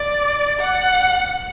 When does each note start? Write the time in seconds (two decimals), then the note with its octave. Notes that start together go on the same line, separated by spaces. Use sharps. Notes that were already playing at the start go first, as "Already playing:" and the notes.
Already playing: D5
0.60 F#5